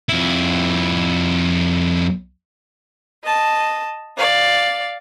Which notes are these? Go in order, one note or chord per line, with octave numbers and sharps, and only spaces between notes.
F2 E4
D#5 A5
D5 F5